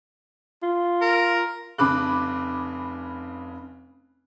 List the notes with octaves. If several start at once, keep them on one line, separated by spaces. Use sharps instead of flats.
F4
A#4
F1 C#3 B5 D6 F#6